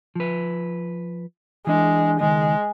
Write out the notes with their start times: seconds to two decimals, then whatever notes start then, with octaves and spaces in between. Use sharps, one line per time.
0.16 F3 B4
1.67 E3 G#3 D4
2.20 C#2 D#3 G#3